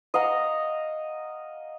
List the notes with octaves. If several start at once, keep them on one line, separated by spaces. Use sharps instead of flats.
D#5 F5 F#5 A#5